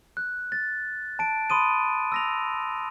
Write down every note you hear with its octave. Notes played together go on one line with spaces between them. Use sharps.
F#6
A6
A5 D7
B5 C6 D#6 D#7
E6 A#6 F7